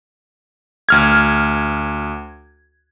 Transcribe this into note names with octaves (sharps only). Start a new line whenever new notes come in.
D2 F6 G#6